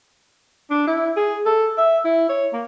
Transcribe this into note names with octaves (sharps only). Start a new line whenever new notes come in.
D4
E4
G#4
A4
E5
E4
C#5
A#3